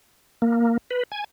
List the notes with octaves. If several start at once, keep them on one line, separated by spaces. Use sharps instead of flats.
A#3
B4
G#5